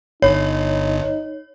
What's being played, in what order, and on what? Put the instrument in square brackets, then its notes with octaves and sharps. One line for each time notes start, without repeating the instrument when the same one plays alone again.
[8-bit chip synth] G1 [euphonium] D#4 [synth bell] C#5